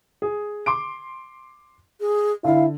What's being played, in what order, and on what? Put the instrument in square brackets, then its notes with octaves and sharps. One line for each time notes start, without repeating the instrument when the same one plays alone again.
[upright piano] G#4
C6 D6 D7
[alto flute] G#4
[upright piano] D3 [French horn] E4 [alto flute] F5